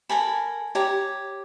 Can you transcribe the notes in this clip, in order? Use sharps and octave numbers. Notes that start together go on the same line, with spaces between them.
A4 A#4 G#5 B5
G4 C#5 A#5